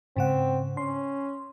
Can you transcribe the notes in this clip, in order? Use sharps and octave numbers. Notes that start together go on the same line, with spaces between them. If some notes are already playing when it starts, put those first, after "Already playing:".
G#2 C#3 C4 F#5
C#4 C6